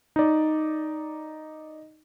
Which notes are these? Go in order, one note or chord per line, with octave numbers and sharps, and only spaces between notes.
D#4 D5